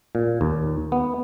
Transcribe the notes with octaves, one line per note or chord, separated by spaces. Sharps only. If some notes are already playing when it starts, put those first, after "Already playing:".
A#2
D#2
B3